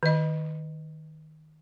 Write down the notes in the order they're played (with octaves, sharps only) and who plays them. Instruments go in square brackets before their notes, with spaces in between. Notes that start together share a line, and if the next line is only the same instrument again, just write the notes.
[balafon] D#3 D#5